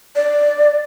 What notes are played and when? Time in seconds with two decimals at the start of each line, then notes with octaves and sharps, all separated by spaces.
0.16 D5